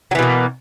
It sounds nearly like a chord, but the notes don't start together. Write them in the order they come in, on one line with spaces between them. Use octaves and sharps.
F#3 E3 B2 A#3